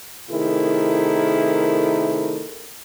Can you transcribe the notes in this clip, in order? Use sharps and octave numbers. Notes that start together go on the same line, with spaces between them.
C3 D#3 A3 E4 G#4 A#4